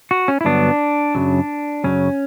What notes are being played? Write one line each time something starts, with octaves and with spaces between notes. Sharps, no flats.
F#4
C#4
E4
G2 D3 F#3 B3 D4
F#2 C#3 F#3
F#2 C#3 F#3 C#4